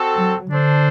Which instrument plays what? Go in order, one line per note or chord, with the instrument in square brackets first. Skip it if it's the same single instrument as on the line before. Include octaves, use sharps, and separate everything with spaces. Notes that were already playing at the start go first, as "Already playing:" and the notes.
Already playing: [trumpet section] C4 F#4 A4
[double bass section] F#3
[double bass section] D3 [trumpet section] D4 A4 C5